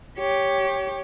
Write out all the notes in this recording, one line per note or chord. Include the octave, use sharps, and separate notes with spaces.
G4 C#5